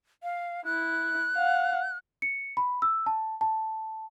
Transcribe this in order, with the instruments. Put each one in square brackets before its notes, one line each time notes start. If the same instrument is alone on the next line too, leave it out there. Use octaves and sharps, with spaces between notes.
[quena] F5
[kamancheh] E4 [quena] F#6
[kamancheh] F5 F#5
[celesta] C#7
B5
E6
A5
A5